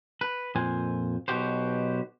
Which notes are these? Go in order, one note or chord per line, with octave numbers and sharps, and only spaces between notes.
B4
F2 A#2 C5 G#5
B1 B2 F3 F#4 G4 C5